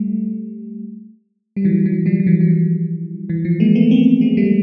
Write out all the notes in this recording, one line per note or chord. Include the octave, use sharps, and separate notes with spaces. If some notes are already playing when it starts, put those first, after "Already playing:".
Already playing: G3 A3
G3
E3 F#3
E3 F#3
F3 G3
F3
E3 F#3
F#3
F3
E3
F3
G#3 A#3
A3 B3
A#3 C4
G#3 A#3
G3 A3